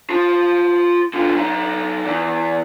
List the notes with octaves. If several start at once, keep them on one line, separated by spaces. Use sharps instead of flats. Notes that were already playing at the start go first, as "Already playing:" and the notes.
F4 A5
D3 F4
F#3 D#4
E2